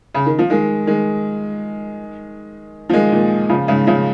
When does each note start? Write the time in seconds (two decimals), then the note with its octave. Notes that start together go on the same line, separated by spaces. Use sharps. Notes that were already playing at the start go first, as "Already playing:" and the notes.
0.14 C#3
0.26 D#3
0.39 F3
0.50 D#3 G#3
0.87 D#3 G#3
2.89 F3
2.93 D#3 G#3
3.12 A#2 D#3
3.49 C#3 F3
3.68 G#2 C#3
3.87 C#3 F3